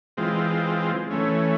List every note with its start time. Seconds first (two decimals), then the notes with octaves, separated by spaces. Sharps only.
0.17 E3 G#3 C4 F4
1.10 E3 A3 C#4